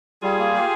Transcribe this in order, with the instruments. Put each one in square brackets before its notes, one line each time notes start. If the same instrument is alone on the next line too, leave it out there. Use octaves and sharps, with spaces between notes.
[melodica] G3 [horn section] F4 G#4
[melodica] A#3
G4